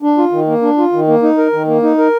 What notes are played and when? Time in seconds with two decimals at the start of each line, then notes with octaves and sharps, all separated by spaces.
0.02 D4
0.18 F4
0.32 D#3
0.47 A#3
0.62 D4
0.78 F4
0.93 D#3
1.08 A#3
1.22 D#4
1.38 A#4
1.53 D#3
1.67 A#3
1.83 D#4
1.98 A#4